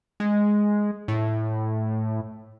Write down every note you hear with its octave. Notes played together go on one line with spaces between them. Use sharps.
G#3
A2